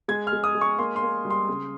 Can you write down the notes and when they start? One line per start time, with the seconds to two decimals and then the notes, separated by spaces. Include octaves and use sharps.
0.08 G#3 G#6
0.27 F6
0.33 G#3
0.44 D#6
0.55 G#3
0.61 C#6
0.78 A#3 C6
0.96 C6
1.02 A#3
1.25 G3
1.30 C6
1.49 C#3